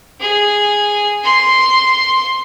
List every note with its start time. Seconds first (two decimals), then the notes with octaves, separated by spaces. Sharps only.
0.21 G#4
1.24 C6